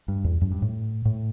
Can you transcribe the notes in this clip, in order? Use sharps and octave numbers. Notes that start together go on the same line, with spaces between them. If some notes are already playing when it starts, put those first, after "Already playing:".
G2
E2
F#2
G2
A2
A2